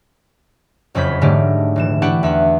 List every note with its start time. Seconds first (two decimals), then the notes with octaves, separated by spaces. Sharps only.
0.95 F#1 F2 F#3 B5 G6 B6
1.21 G#2 D3 F#3 A3 D#4 G4
1.76 D#1 E3 E7
2.02 D4 E4 F#4 G4 B4 F#5
2.23 E2 E5 F#5